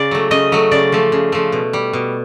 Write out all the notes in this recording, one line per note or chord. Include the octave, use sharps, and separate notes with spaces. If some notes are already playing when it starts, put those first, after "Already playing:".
Already playing: C#3 D5
F#3 A3
C#3 D#5
F#3 A3
C#3 D5
F3 A3
C#3
F3 A3
B2
G3
B2